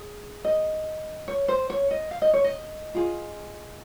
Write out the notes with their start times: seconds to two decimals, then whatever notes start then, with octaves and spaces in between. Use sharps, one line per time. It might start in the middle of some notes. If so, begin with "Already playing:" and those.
Already playing: G#4
0.45 D#5
1.28 C#5
1.48 C5
1.70 C#5
1.91 D#5
2.11 F5
2.22 D#5
2.33 C#5
2.44 D#5
2.95 F4 G#4